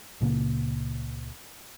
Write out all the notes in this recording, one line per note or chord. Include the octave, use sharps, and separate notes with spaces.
C#2 A#2 C#3 A#3